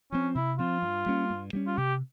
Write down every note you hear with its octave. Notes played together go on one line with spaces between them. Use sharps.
F3 C4 C#4
C3 E4
F3 C4 F4
G2
G3 A#3 C#4
G2
G3 A#3 C#4
F4
C3 G4